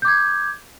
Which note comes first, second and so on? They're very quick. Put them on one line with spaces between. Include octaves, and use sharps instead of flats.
G6 D6 G#6